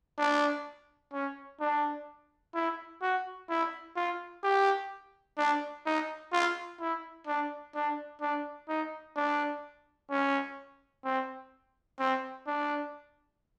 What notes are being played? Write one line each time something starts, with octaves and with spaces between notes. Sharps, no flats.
D4
C#4
D4
E4
F#4
E4
F4
G4
D4
D#4
F4
E4
D4
D4
D4
D#4
D4
C#4
C4
C4
D4